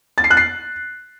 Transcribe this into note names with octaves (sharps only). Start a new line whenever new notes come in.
A6
C7
F#6
C7